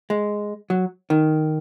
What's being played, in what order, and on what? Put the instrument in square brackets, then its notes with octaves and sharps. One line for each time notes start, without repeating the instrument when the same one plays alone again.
[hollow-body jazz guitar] G#3
F#3
D#3